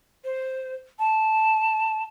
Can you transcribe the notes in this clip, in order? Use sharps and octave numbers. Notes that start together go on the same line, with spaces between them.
C5
A5